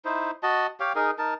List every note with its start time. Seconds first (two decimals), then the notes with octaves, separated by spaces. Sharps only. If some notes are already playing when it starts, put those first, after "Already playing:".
0.05 D#4 E4 C5
0.43 F#4 D#5 A5
0.80 G4 C#5 F5 G5
0.95 D#4 G#4 A#4
1.19 D#4 A#4 A5